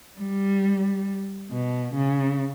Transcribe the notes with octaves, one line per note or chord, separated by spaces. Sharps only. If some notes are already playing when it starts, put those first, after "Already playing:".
G3
B2
C#3